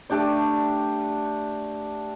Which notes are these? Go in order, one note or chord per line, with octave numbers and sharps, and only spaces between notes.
A3 D4 G4 D5